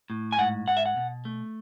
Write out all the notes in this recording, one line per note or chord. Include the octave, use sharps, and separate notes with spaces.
A2
G#5
G#2 F#5
G#2 F#5
E5
F#5
B2
A3